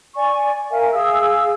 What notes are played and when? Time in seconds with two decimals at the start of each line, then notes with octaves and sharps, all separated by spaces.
0.14 D5 G#5 C#6
0.70 A#4 E5 F5 G#5
0.92 G#4 F5 E6